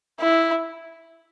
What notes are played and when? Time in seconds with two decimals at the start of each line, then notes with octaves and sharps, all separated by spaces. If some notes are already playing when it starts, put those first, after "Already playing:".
0.20 E4